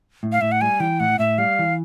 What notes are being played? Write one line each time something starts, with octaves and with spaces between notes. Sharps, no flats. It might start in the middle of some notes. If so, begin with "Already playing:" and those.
A2
F5
A2 E5
F#5
G3 G#5
E3 G5
A2 F#5
A2 E5
G3 F5
E3